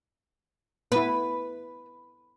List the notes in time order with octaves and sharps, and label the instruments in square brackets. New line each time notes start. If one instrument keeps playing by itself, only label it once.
[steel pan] B3 E4 [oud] B4